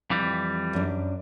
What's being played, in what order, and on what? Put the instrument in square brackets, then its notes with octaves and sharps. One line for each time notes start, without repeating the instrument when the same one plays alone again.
[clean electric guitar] F2 E3 G3
[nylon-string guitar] F#2 D4